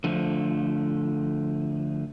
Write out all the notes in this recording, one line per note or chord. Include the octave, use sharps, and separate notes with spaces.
D3 F3 A3